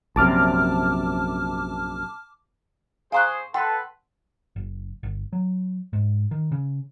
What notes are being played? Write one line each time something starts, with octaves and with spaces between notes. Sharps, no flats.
A#1 F#2 C3 A5 D6 F6
G#4 C5 F5 G#5 A#5 C6 C#6 F#6
A4 B4 F#5 G5 C6
F#1
G1
F#3
G#2
D#3
C#3